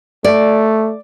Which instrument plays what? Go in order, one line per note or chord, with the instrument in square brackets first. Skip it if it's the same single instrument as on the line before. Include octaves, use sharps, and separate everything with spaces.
[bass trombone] A3 [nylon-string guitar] D5